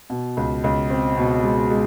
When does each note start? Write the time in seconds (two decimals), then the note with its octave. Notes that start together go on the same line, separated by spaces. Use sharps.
0.10 B2
0.37 C#2
0.64 C#2
0.90 C4
1.17 B2
1.43 G#3
1.70 G#3